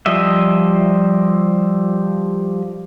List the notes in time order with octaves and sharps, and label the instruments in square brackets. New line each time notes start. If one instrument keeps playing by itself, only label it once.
[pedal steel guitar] F3 G3 D#5 E5